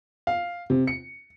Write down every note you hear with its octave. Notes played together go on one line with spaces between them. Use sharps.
F5
C3
C#7